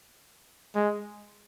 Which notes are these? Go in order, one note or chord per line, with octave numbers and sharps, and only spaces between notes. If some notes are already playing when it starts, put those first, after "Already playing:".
G#3